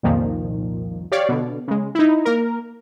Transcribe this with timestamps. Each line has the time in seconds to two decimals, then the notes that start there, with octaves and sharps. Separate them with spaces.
0.03 C2 F2 A#2 D#3 F3
1.12 G4 C#5 D5 F5
1.29 B2 D3
1.68 C#3 G#3
1.95 D#4 E4
2.25 A#3 A#4